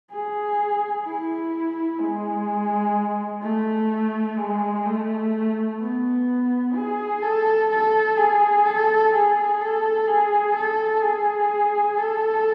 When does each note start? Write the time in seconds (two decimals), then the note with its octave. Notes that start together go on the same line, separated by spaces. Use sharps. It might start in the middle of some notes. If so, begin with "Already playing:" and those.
0.11 G#4
1.05 E4
2.00 G#3
3.42 A3
4.37 G#3
4.86 A3
5.80 B3
6.75 G#4
7.22 A4
7.71 A4
8.17 G#4
8.65 A4
9.13 G#4
9.60 A4
10.07 G#4
10.55 A4
11.02 G#4
11.98 A4